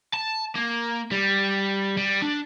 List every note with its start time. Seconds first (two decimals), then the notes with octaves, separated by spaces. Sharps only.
0.14 A5
0.56 A#3
1.12 G3
1.97 G3
2.22 D4